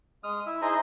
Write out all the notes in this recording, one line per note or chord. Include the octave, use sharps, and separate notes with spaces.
G#3 D#6 F6
E4 E5
D#4 E4 G#4 C5 D#5 A#5